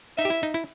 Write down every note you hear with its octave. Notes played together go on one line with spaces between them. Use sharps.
D#4 E5
G4
E4
D#4
E4